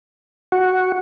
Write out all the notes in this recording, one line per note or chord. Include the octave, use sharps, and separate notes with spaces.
F#4